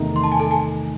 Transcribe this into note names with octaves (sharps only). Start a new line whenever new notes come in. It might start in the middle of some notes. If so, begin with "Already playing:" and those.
Already playing: E2 C3 D#3 A3 D#4
C6
A5
G#5
A4 A5
G#5